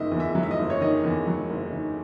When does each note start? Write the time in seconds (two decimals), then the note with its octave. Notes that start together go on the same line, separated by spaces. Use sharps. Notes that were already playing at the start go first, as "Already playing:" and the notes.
Already playing: F#1 D#3 D#5 E5
0.11 E2
0.20 E5
0.35 F#3
0.43 E5
0.51 D#5
0.59 F#1
0.70 C#5
0.81 D#3 D#5
1.04 E2
1.27 F#3
1.50 F#1
1.72 D#3